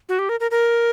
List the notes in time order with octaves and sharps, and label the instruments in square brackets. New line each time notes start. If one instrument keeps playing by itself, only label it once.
[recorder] F#4
G4
A#4
A#4
A#4